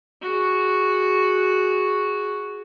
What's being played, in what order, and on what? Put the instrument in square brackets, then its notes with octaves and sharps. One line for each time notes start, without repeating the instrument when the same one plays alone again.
[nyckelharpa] F#4 G#4